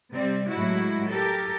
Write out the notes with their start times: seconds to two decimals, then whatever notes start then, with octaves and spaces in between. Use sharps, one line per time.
0.12 C3 G3 C4
0.49 A2 F#3 G#3 E4 F#4
1.09 G4 A4 A#4